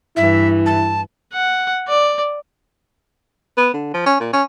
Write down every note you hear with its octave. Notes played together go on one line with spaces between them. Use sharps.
G2 E3 E4 E5
A5
F#5
D5
B3
D3
F3
C#4
A#2
C#4